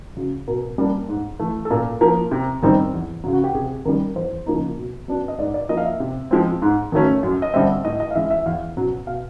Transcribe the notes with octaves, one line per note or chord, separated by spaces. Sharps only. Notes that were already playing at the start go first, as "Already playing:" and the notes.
C#3 F#3
B2 A#4
G3 A#3 D4
G#2
E3 A3
A4
A#2 A#4
F3 A#3 A#4
C3
D#3 G3 C4 D#4
E2
C#3 F#3
F#4
G4
C3 G#4
D#3 G3 A#4
E2 C5
C#3 F3 A#3 D#4
B2
F#3 B3 D4
D#5
G#2 D5
D5
F3 A#3 D#5
F5
E5
C3
F3 G#3 C4
G#2
D#3 F#3 A3 C#4
F#2
D#5
D3 G3 C4 E5
A2 D#5
D#5
F5
E3 G#3 E5
E5
E2 F5
B2 F#3
B2 F5